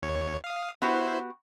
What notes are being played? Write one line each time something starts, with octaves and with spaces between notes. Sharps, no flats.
D#2 C#5
F5 D#6
B3 E4 F#4 G4 C5